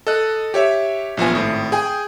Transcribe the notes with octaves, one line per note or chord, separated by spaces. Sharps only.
A4 D#5 F#6
G4 C#5 E5
A#1 F3 B3 G#5
G#1 A2
G#4 G5 G#5